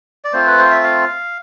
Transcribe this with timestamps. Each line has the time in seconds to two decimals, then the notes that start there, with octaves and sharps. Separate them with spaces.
0.25 D5
0.33 A3 C4 F4 C5
0.47 B4
0.58 C5
0.65 F5
0.71 E5
0.84 F5